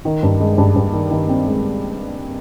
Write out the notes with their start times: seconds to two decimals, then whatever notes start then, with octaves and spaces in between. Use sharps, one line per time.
0.05 D#3
0.23 G2
0.40 G#3
0.58 G2
0.76 G2
0.93 D#3
1.11 D#3
1.29 C4
1.46 G#3